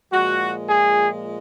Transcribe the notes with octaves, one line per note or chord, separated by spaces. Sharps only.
A#2 F3 G#3 F#4
G#4